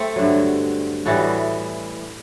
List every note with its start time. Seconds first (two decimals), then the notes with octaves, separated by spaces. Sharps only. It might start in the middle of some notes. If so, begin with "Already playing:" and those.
Already playing: A3 C4
0.16 G2 D3 F#3
1.05 A2 E3 G3 F#4 A4